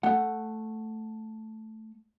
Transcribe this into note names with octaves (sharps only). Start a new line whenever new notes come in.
A3 F#5